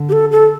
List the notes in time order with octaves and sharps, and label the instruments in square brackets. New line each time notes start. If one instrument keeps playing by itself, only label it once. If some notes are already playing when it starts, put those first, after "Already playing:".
Already playing: [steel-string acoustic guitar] D3
[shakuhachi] G4
A4
A4